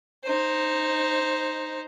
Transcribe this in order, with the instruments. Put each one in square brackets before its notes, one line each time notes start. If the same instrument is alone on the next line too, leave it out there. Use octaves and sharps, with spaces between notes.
[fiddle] D#4 C5